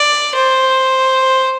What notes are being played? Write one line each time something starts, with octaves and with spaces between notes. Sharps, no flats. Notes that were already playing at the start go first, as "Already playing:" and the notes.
Already playing: D5
C5